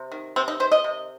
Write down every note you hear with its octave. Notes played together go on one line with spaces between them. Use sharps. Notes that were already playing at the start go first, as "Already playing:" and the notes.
Already playing: C3
D#3
C3 C4
D#4
D#3 C5
D#5
C3